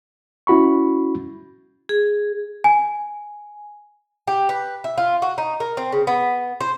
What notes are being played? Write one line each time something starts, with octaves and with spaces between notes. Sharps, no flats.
C#4 E4 F#4 B5 C#6
G#4
G#5
G4
B4
E5
F4
F#4
D#4
A#4
C4
C#3
B3
C5